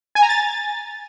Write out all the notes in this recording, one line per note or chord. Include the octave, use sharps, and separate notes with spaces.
G#5
A#5
A6